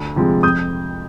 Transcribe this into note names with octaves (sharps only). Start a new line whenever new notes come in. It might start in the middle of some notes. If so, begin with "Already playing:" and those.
Already playing: D2
C3 F3 G#3
F2 D#6 G6